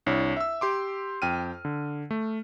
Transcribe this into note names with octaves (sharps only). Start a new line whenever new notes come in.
C2 D4 E4 C#5
E5 E6
G4 C6 D6
F2 G5 F6 D#7
D3
A3